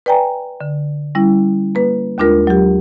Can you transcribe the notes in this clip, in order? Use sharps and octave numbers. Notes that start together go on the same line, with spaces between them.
B4 D5 G5 G#5 A#5
D3
G3 C#4 E4
A#3 B4
D#2 G#3 D4 F4 A#4
F#3 G4